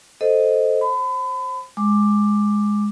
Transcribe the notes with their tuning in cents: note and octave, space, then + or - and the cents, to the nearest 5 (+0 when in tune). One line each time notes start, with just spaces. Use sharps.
A4 +0 C5 +0 D#5 +0
C5 +30 B5 +35
G#3 +0 D6 +10